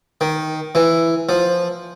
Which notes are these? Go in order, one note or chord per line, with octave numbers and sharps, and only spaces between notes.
D#3
E3
F3